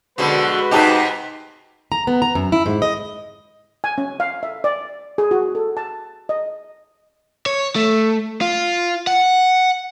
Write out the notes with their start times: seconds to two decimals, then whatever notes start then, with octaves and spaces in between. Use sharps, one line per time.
0.18 B2 D3 F3 G#3 F#4 B4
0.71 G#2 C3 D#4 G4 A5 F#6
1.92 A#5
2.07 B3
2.22 A#5
2.35 F#2
2.52 E4
2.66 G#2
2.82 D#5
3.84 G#5
3.98 C#4
4.20 F5
4.43 E5
4.64 D5
5.18 G#4
5.31 F#4
5.55 A4
5.77 A5
6.29 D#5
7.46 C#5
7.75 A3
8.41 F4
9.07 F#5